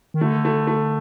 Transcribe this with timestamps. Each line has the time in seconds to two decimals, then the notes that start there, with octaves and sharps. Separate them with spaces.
0.14 D#3
0.21 D3 A3
0.45 A3
0.67 A3